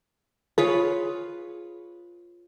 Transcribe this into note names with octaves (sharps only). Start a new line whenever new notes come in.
F4 G#4 B4 C#5